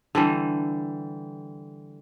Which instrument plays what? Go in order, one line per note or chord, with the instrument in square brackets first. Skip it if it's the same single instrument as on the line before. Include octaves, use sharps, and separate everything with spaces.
[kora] D3 E3 G3